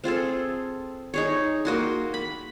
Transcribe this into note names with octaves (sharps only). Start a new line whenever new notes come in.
C4 F4 G#4 A4
D#4 G#4 C#5
A#3 F#4 C6
B5